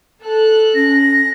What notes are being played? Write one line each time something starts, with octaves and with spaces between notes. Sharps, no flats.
A4 F#6
C#4 A#6